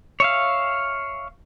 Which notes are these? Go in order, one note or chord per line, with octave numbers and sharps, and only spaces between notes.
C#5 E5 F5